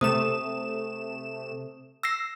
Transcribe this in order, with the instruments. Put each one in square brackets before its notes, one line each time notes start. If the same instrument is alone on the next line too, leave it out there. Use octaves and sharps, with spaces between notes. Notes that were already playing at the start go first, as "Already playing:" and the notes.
[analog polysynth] C3 A3 E7 [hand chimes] D#6
[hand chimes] E6 A#6 C7